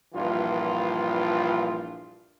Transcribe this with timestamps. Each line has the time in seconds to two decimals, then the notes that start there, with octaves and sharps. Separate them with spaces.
0.14 A#1 G2 E3 F4